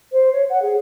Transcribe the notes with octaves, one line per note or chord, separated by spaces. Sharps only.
C5
C#5
F#5
G#4